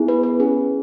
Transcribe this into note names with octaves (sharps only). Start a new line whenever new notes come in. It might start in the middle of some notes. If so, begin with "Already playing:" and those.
Already playing: B3 E4 G#4
B4
B4
C#4 G#4